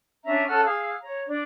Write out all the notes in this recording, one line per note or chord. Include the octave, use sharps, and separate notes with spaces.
C#4 D4 E5 A#5
C#4 A4 F#5 F6
G#4 F5 E6
C#5 A#5
D4